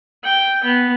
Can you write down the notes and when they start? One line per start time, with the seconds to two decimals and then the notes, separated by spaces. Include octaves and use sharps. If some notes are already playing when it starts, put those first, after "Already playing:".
0.24 G5
0.63 B3